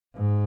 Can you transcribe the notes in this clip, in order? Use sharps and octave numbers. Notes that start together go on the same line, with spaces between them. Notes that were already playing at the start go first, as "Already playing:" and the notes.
G#2